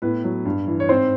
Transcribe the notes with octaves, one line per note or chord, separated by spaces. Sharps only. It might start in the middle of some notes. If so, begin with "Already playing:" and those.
A2 B3 B4
F#3
G2
E3
C#5
G#2 C4 C5